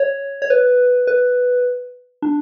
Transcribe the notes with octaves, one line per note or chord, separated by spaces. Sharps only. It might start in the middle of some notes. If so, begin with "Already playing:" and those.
Already playing: C#5
C#5
B4
B4
D4